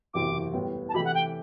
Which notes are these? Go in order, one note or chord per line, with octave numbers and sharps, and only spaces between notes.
F#1 E2 C3 F#3 C4 D6
A2 G3 B3
A5
C3 E3 A3 E4 G4 B5
F#5
G5